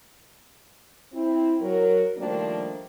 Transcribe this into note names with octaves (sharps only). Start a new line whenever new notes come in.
C4 E4
F#3 A#4
D#3 F3 G3 A3 A#3 D4